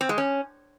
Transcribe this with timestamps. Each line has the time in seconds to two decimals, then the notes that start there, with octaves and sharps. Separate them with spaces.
0.01 C4
0.09 G#3
0.18 C#4